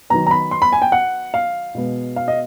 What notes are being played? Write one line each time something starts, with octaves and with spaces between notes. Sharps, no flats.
D#3 F#3 B3 A#5
A#5
B5
C6
B5
G#5
G5
F#5
F5
B2 G#3 B3
F5
D#5